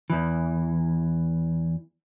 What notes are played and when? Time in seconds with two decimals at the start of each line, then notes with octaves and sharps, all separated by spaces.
0.10 E2 E3